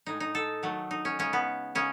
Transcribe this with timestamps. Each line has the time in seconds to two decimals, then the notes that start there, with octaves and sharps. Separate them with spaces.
0.06 A2 G#3 D#4
0.20 D#4
0.35 A4
0.63 D#3 F#3 A3
0.91 D#4
1.05 C#4
1.19 C#3 G#3 C#4
1.33 B3
1.75 C#3 G#3 C#4